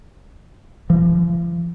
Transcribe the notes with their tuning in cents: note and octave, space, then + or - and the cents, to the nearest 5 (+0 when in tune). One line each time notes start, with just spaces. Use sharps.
F3 -40